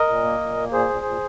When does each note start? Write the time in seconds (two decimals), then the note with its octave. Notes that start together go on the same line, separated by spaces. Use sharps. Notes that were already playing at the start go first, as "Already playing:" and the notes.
Already playing: A#4 D#5
0.08 A#2
0.24 A#3
0.41 A#2
0.57 A#3
0.72 A#2 G#4 C5
0.89 A#2
1.05 A#2